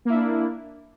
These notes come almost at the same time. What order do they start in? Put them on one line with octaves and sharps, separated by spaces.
A#3 E4 D4